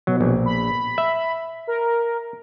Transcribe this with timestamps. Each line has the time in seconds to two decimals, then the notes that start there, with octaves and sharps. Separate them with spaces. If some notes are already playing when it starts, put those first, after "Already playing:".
0.07 B2 F#3
0.21 A#1
0.46 B5
0.98 E5
1.67 A#4